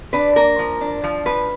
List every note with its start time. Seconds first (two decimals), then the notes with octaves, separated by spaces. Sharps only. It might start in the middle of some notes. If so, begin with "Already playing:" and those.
0.13 D4 B4
0.36 A#3 A#4
0.59 F3
0.81 D4
1.04 F3
1.26 F3 B4